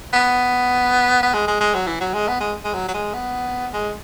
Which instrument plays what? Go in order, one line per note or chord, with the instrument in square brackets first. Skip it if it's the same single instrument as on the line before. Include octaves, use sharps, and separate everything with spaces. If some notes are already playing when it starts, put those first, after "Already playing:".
[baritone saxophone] B3
B3
G#3
G#3
G#3
F#3
E3
F#3
G#3
B3
G#3
G#3
F#3
F#3
G#3
B3
G#3